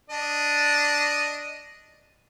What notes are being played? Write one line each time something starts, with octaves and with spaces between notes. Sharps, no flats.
D4 D#5